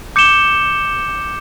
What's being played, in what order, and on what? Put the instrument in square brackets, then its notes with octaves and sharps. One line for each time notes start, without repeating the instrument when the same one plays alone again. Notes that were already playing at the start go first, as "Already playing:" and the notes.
[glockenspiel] D6 G6 C#7 E7 G7